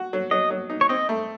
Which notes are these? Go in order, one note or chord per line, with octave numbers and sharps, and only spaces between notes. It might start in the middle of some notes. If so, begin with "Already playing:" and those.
Already playing: F#4
F#3
F#3 D#5
F#3
D#4
C#5
C4 D#5
A3